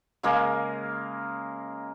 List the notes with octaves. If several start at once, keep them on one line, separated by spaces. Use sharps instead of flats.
C#3 G#3 A#3 A#4